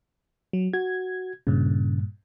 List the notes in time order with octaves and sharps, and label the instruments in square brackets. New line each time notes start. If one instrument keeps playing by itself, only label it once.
[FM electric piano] F#3
[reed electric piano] F#4 [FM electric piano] G#6
[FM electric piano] G2 A#2 [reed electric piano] C#3